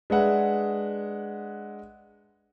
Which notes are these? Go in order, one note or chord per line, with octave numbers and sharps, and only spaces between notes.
G#3 D4 G#4 B4 E5 F#5